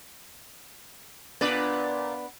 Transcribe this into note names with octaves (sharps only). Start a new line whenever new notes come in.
A#2 B3 D4 B4 D5